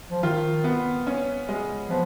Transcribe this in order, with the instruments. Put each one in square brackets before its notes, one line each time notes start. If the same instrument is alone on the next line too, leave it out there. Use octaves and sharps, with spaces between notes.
[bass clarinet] F3
[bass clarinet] D#3 [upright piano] F4
[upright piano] B3
C#4
G#3
[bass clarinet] F3 [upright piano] B3